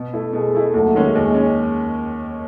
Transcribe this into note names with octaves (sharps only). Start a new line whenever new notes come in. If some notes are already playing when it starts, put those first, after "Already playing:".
Already playing: B2
A3 E4
B2 G#3
A3 E4
D#2 F#3 A3
D#3 G#3 C#4
D#2 G#3
C#4